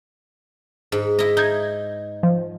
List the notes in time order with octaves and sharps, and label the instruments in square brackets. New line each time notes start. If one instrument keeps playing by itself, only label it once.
[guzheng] G#2
E4 D#5
[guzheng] D#4 [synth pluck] G6 G#6
[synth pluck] F3